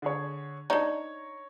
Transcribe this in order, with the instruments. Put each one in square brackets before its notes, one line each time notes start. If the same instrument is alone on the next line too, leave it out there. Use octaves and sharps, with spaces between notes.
[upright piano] D3 G#4 C#5
[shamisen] D4 D#4 [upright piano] C#5 A#5